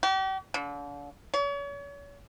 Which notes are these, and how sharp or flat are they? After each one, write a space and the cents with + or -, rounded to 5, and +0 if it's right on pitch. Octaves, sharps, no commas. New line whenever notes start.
G4 -40
D3 -40
C#5 +40